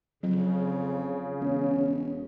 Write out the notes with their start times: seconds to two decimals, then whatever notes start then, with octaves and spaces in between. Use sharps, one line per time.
0.23 F2 C#3 F#3
1.40 E1 C#4